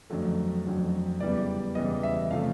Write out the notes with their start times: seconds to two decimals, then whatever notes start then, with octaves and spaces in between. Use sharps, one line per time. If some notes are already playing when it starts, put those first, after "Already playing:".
0.10 F2 D3 F#3 A3
0.65 F2 D3 F#3 A3
1.20 E2 C#3 E3 G3 B3 D5
1.75 E2 C#3 E3 G3 B3 D#5
2.03 E5
2.31 C3 F3 A3 C#4 F5